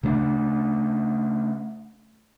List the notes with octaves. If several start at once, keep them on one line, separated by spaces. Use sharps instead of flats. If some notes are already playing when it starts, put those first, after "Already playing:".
C#3 A3 C4 D4